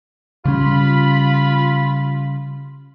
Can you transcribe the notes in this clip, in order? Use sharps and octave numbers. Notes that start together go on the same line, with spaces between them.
C#3 G3 C#4 F4 B5